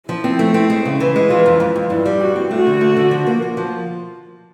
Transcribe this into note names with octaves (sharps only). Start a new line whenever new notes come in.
F3 E4
C4
A3
C4
G#3
C#3
E3
G#3
E3 F4
F2
F2
F2
G2 E4
G3
G2 F#4
C4
A3 F#4
D3
A3
D3
F3
A#3
A#3
F3